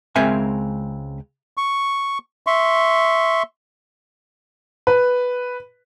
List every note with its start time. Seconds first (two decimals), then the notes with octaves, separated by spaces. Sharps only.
0.16 C#2 G#3 C4 A#4 E5 G#5
1.57 C#6
2.47 E5 C6 C#6
4.87 B4